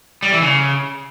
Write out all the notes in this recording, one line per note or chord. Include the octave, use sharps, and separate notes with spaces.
G3
E3
C#3